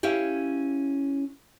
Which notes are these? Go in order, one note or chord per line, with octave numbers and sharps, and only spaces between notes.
C#4 E4 G4 F5